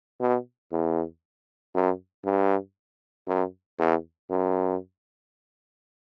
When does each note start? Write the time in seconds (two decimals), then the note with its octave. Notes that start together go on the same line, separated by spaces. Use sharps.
0.20 B2
0.72 E2
1.75 F#2
2.25 G2
3.28 F#2
3.79 E2
4.30 F#2